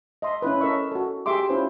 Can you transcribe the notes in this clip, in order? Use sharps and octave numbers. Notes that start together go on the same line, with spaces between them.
D#5 E5 C6
C#4 E4 B4
C#4 A4 A#4 D#5 E5 C#6
F#4 A4
G4 G#4 E5 C6 D6
C#4 E4 F4 B4 C5